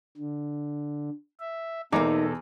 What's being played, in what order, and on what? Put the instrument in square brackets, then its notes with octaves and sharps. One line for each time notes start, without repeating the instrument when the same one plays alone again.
[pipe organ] D3
E5
[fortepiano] E2 A#5 D6 [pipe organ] B2 A4 [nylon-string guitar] A#3 D#4